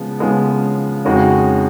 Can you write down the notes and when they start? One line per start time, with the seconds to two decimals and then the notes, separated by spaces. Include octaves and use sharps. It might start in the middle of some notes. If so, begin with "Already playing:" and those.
Already playing: C#3 F3 G#3 B3
0.19 C#3 F3 G#3 B3
1.05 F2 C#3 G#3 D#4 F#4